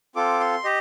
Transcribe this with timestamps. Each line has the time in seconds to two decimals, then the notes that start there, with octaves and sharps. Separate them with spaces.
0.16 C4 F4 A4 D6
0.40 C6
0.64 G4 D#5